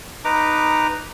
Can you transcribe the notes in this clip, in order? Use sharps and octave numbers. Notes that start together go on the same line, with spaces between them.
D#4 B4 A#5 D6